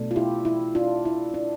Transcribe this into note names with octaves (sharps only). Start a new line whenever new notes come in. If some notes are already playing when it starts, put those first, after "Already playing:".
Already playing: B2 A3 D4
F4
E4 G4
E4
D4 F4
E4
D4